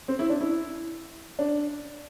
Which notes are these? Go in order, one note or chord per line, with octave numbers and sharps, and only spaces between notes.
C4
E4
D4
E4
D4